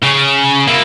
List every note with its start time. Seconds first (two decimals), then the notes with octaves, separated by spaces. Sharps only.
0.03 C#3
0.67 A#3 E4